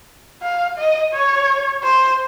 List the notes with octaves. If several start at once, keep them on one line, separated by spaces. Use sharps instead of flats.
F5
D#5
C#5
C5